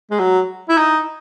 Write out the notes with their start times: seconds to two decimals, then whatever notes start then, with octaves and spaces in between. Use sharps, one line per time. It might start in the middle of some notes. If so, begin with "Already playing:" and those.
0.11 G#3
0.19 F#3
0.69 E4
0.78 D#4